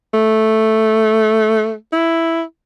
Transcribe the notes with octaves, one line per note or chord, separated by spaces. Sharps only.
A3
E4